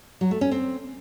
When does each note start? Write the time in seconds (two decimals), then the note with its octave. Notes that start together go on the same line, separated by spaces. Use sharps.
0.21 F#3
0.31 A3
0.41 C#4
0.51 C4